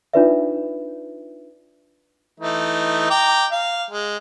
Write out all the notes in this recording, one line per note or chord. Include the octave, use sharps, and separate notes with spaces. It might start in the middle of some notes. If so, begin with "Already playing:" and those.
D4 D#4 F4 B4 D5 E5
E3 A3 D#4
G5 A#5 D6
F5
G#3